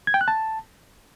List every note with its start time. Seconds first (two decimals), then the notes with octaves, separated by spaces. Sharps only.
0.07 G#6
0.14 G5
0.21 F#6
0.28 A5